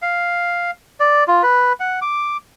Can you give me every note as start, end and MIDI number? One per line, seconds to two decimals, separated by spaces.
0.02 0.71 77
1.00 1.24 74
1.28 1.43 65
1.43 1.73 71
1.80 2.00 78
2.02 2.37 86